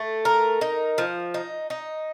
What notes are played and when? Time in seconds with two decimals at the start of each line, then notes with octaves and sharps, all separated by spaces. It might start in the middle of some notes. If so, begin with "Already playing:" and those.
Already playing: A3
0.25 A#4
0.61 D#4
0.98 F3
1.34 D#4
1.70 D#4